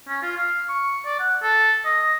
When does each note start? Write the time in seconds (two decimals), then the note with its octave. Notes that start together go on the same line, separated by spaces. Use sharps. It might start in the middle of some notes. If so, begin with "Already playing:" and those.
0.08 C#4
0.23 F4
0.37 F5
0.69 C#6
1.06 D5
1.19 F#5
1.43 A4
1.85 D#5